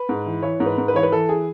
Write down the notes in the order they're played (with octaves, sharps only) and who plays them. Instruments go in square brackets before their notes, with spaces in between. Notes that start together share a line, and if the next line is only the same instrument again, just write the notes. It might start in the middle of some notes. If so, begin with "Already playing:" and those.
Already playing: [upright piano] B4
G#2
E3
E3 C#5
G#2
B4
G#2
B4
E3 C#5
B4
E3 A4
G#4